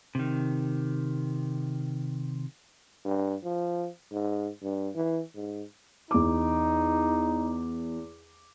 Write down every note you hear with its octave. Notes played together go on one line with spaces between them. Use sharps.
C3 D#3
G2
F3
G#2
G2
E3
G#2
E2 D#4 D6